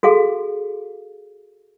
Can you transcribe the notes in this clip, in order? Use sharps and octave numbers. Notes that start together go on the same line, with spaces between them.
F#4 G#4 A4 F5